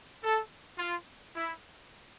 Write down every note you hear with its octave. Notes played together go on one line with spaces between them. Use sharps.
A4
F4
E4